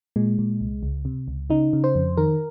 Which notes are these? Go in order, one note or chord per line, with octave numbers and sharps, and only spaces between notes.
A#2 G#3
A#2
C2
C#2
C3
C#2
C#3 D#4
C#3
C5
F2
D#3 A#4